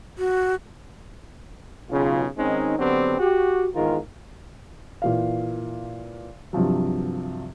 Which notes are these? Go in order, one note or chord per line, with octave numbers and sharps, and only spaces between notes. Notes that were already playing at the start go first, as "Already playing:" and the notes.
F#4
B1 C#3 F4
D#3 G#3 C4 C#4 D#4
D3 F#3 B3 C4 D4 G4
F#4 G4
E2 G#2 D#3 G#3 F4 A#4
A#2 E3 F5
G2 C3 F3 F#3